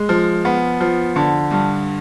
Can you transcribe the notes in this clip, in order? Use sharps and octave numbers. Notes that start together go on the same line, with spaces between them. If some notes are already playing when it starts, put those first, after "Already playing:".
Already playing: G#3
F3
B3
F3
D3
G2